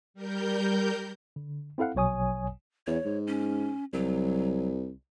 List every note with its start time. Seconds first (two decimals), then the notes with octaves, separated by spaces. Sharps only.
0.14 G3 A#4 G6
1.36 D3
1.78 C4 E4 A4 F5 F#5
1.95 A#1 B2 F#3 C#5 G#5 D#6
2.87 E2 C#5
3.05 G#2
3.27 C#4
3.93 C2 F#3